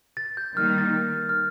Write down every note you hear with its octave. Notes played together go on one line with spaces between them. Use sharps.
A6
G6
D#3 G3 A#3 D#4 F6
A6
F6